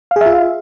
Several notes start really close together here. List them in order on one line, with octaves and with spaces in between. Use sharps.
F5 G#4 E5 F4